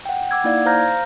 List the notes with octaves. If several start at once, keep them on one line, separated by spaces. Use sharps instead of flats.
F#5 G5
F#5 D6 E6 G#6
A#3 D#4 E4 D5 F5 G#6
C5 F5 A#5 F6 G6 A#6
F5